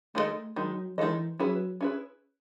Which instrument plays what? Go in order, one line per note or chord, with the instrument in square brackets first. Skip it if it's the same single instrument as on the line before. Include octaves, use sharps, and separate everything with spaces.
[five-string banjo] D#3 G#3 D#4 A4 D#5 [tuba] A3
[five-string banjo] D#3 G#3 [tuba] F#3
[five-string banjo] D#3 G#3 D#4 A4 D#5 [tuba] E3
[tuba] F#3 [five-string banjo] C#4 E4 G#4 B4
[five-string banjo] C#4 E4 G#4 B4